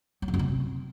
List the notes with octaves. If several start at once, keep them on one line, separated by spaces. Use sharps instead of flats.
F#3
A#2
F#2
C3